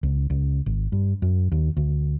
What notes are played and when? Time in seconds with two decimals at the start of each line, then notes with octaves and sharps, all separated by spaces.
0.03 C#2
0.30 C#2
0.66 G#1
0.92 G2
1.22 F#2
1.52 D#2
1.77 D2